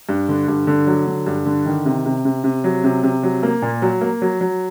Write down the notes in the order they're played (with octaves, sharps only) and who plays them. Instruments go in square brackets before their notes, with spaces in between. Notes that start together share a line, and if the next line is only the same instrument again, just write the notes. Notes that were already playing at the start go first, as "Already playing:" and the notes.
[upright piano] G2
D3
G2
D3
F#3
D3
G2
D3
D#3
C3
C3
C3
C3
F#3
C3
C3
F#3
A#3
A#2
F#3
A#3
F#3
F#3